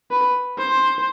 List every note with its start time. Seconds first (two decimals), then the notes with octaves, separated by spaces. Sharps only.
0.11 B4
0.58 C5